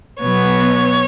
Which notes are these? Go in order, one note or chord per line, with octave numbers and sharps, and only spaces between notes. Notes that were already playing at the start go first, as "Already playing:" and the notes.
B2 F#3 B3 C#5